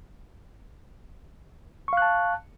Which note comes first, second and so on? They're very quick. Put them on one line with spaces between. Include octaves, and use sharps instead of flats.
C#6 F5 F#6 A5